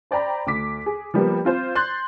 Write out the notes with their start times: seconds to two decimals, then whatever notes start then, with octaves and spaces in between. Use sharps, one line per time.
0.11 C5 D5 G5 A#5 B5
0.47 D2 D6 B6
0.86 G#4
1.14 F3 G3 A#3 B3
1.45 C4 F4 C5
1.75 C6 F#6 G6 A6